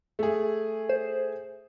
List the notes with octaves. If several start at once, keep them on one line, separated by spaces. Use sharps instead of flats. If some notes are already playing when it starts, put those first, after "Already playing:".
A3 G#4
C5